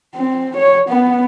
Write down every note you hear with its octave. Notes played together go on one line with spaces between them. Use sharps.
C4
C#5
B3